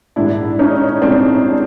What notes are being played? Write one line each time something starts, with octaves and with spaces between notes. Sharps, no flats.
A#1 G#2 D#3 G3 D4 E4
C#4 D#4
A#1 G#2 D#3 G3 C4 D4